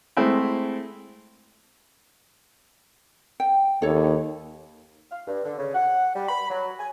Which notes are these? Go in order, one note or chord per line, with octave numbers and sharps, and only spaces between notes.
G#3 A3 C4 E4
G5
D#2 A4 C#5
F5
G2
D3
C#3
F#5
G3
B5
F#3
G#5